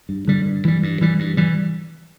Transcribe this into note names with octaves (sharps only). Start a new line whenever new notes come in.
G2
D3 G3
G2
E3 G3
G2
E3 G3
G2
E3 G3